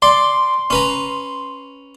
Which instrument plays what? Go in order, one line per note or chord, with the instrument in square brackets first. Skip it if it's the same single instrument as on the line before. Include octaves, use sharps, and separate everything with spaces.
[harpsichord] D5 [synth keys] C6
[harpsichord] C#4 B4 A#5